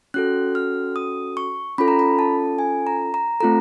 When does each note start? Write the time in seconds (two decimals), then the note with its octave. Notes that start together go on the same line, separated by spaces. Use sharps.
0.14 C#4 F#4 A4 F#6
0.55 F6
0.96 D#6
1.37 C#6
1.78 C#4 F4 A4 B5
1.88 A#5
1.99 B5
2.19 A5
2.59 G#5
2.87 A#5
3.14 A#5
3.40 A3 C4 F4 A4 A#5